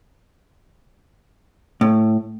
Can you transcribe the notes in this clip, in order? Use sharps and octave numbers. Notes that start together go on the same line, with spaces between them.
A2